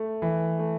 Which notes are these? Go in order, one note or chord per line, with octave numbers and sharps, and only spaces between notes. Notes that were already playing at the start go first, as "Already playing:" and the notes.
Already playing: A3
E3
A3